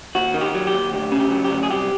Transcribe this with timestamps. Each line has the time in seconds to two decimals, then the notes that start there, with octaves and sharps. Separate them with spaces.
0.15 D#2 F#4
0.34 D#3
0.41 G4
0.54 F#3
0.67 G4
0.74 D#2
0.93 D2 G4
1.12 C#3
1.19 G4
1.31 F#3
1.44 G4
1.51 D2
1.63 G#4
1.70 C2 G4